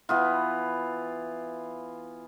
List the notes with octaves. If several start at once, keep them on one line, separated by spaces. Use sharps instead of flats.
E3 B3 F4